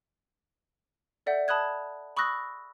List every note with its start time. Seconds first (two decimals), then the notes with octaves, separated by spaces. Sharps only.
1.26 A4 D5 E5 F#5 G6
1.48 A5 B5 D#6 F#6 G#6
2.17 B5 C#6 D#6 E6 F#6 A#6